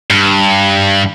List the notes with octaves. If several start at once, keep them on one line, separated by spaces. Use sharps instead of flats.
G2